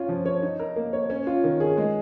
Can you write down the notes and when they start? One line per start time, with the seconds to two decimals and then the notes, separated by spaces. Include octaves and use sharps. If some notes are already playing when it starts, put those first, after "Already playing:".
Already playing: C#4 F4
0.09 F3
0.26 C#5
0.42 D#4
0.59 A#4
0.76 A#3
0.93 C#5
1.10 C#4
1.27 F4
1.44 D#3
1.60 G#4
1.77 G#3